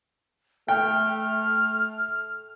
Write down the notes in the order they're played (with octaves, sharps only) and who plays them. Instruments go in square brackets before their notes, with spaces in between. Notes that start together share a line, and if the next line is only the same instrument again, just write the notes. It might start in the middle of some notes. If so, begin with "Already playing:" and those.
[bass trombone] A3 [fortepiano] G5 [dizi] F6